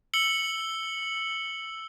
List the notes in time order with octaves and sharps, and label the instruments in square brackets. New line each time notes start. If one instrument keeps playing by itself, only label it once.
[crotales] E6 C#7 F#7 G7